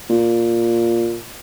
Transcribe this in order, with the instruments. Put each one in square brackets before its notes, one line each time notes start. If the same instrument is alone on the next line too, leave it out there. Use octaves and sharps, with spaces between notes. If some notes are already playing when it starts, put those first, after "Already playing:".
[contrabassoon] A#2